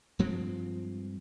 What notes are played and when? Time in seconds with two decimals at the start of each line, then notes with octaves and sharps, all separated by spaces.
0.19 G2 F3 G#3 C4